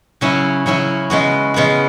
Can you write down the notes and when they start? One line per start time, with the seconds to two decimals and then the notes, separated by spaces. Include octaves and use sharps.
0.21 C#3 F#3 C#4 E4
0.66 C#3 F#3 C#4 E4
1.10 C#3 G#3 B3 F#4
1.54 C#3 G#3 B3 F#4